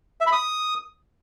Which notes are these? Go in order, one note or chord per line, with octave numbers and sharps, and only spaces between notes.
E5
B5
D#6